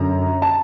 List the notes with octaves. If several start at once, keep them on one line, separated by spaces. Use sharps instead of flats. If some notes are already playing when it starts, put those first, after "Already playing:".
Already playing: F#2 D3 A#5
A5